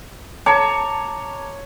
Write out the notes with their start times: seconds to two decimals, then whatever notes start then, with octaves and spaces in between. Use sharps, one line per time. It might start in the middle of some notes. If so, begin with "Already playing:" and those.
0.46 C#5 A5 A#5 D6